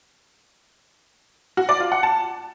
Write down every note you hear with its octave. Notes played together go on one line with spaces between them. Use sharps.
F#4
D5
F4
F#5
A5